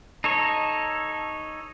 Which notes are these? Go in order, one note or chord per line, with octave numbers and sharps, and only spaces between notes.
D#4 A4 C#5